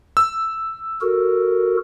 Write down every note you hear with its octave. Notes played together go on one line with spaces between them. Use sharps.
E6
F#4 A4 A#4